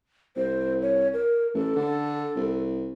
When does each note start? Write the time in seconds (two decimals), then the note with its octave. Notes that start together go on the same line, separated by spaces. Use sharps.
0.36 C2 C5
0.82 C#5
1.13 A#4
1.55 A1 A4
1.76 D3
2.36 C2